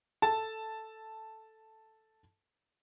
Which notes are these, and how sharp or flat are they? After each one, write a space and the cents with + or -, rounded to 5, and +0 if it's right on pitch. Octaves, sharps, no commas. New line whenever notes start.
A4 +0 A5 +0